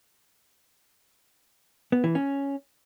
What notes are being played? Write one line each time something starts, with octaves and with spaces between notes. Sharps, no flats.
B3
E3
C#4